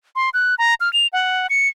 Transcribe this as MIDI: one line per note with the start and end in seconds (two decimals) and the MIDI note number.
0.16 0.30 84
0.34 0.55 90
0.58 0.74 82
0.81 0.91 89
0.93 1.07 101
1.13 1.47 78
1.50 1.68 97